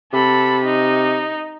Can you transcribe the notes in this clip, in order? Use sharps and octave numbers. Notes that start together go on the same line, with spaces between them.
C3 A4 B5
D#4